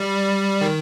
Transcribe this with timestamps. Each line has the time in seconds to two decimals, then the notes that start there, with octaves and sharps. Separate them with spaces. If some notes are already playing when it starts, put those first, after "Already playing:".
Already playing: G3
0.61 D#3